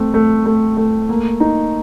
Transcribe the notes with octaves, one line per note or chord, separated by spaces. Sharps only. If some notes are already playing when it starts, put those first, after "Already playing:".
Already playing: A3 C4
A3
A3
A3
A#3
D#4